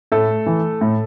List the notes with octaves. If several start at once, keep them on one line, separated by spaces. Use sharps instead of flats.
A2 A3 A4
E3
A2